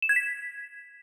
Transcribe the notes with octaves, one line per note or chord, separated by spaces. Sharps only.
E7
G#6
B6